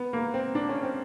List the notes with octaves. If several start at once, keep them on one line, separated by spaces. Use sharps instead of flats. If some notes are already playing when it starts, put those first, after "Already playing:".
Already playing: B3
A#3
C4
D4
C#4
C4